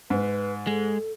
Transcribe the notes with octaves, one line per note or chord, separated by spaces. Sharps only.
G#2 B4
G#3 A4